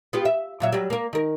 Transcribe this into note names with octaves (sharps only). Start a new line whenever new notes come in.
B3 F4 G4
E5
A#2 F#3 E5
F#3 G3
A#3 A#4
D#3 A#4